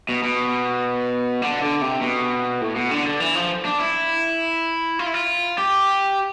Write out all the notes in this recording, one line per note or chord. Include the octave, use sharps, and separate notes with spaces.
B2
B2
D3
D3
C3
B2
A2
B2
D3
D3
E3
F3
D4
E4
F4
E4
F4
G4